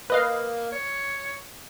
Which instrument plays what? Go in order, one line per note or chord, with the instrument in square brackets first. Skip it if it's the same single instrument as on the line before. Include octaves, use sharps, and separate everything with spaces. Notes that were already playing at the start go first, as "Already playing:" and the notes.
[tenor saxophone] A#3 [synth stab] B4 D#5 F5
[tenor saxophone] C#5